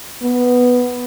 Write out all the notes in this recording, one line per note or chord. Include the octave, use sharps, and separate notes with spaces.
B3